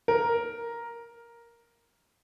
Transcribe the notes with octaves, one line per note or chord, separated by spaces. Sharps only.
A#4